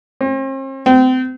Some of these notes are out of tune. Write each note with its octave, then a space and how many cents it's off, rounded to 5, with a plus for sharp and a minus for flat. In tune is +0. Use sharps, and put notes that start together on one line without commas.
C4 +45
C4 -30